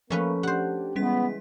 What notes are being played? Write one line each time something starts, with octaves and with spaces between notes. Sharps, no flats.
F3 A3 A#3 C#4 B4
D4 G4 C5 F#5
C#3 E3 G3 G#3 B3 C#4 B6